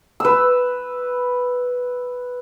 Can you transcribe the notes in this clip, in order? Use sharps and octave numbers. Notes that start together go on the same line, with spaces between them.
B4 E6